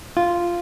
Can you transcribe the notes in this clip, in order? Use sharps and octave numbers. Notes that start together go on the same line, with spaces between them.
F4